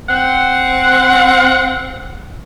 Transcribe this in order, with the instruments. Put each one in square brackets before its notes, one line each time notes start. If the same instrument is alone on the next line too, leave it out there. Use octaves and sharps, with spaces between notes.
[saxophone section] C4 F#5